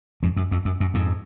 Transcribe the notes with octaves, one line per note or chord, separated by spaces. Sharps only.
F2 G#2
F#2
F2
F#2
F#2
F2 G#2